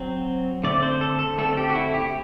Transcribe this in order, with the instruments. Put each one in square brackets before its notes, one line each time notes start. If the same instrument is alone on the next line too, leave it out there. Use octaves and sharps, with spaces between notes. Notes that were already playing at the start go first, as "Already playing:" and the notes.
Already playing: [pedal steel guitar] F#3 C4
D3 A3 C4 D5
C5
A4
A4
D3 A3 C4 A4
A4
G4
F#4
E4
G4